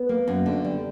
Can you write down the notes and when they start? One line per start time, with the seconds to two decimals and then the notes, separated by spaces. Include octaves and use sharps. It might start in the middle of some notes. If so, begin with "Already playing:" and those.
Already playing: B3
0.09 A#3
0.28 F#2
0.46 D3
0.65 G3